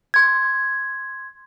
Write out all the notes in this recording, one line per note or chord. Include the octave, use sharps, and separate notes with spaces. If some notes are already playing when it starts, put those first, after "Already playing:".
C6 G#6